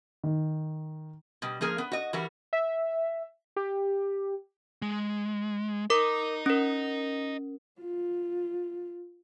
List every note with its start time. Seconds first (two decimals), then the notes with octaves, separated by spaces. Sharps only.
0.24 D#3
1.42 B2 G3
1.61 F3 A#3 G#4 A#4
1.78 B3
1.92 F#4 D#5
2.13 E3 G3 F#4 A#4
2.53 E5
3.56 G4
4.82 G#3
5.90 A#4 D#5 A#5 D6
6.46 C#4 A#4
7.79 F4